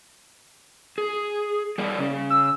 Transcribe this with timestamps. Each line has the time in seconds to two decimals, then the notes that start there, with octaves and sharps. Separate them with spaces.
0.98 G#4
1.78 G3 A#3 D5
1.98 C#3 C#4
2.30 E6